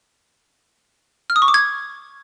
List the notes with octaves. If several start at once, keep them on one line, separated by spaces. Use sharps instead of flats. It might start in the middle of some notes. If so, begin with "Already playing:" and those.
F6
D#6
C#6
D6
G#6